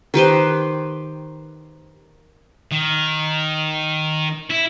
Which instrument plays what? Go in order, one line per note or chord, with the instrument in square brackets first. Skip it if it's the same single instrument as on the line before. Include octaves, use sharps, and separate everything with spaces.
[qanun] D#3 G4 B4 C5
[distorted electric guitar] D#3
E4